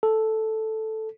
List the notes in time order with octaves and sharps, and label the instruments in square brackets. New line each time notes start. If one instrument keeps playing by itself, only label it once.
[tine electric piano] A4